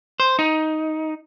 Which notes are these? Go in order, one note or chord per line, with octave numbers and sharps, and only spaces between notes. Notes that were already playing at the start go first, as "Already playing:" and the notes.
C5
D#4